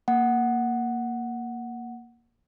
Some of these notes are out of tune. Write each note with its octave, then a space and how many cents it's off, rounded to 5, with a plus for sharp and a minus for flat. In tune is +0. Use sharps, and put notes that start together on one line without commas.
A#3 +0 F#5 +0